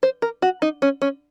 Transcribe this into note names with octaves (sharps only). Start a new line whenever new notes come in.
C5
A#4
F#4
D#4
C#4
C#4